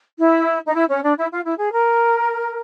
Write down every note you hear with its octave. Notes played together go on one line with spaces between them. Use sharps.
E4
D#4
E4
C#4
D4
E4
F4
E4
G#4
A#4